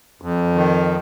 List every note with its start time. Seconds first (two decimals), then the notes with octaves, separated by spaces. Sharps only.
0.22 F2
0.55 D#3